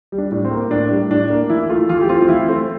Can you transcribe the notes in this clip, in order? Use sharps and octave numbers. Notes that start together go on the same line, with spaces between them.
G3
D4
A2
C4
A#3
A2 D4
G3
A2 D4
A#3
E3 E4
A3 F4
E3 F4
G4
C4 F4
F4
E3 E4
A3 C4